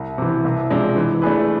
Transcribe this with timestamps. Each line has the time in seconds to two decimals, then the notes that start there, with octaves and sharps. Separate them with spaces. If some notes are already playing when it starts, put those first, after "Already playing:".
Already playing: C2
0.18 C3 E3
0.45 C2
0.70 C3 F3 G#3 D4
0.96 E3
1.22 A3 D4 G#4 B4